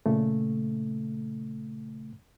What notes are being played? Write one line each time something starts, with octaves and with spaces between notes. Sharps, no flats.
A#2 C#3 A3